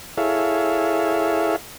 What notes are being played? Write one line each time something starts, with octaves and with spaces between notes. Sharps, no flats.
E4 G#4 A4 C#5 E5 F5